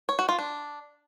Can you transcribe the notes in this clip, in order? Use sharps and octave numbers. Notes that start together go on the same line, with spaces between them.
C#5
F#4
F4
D4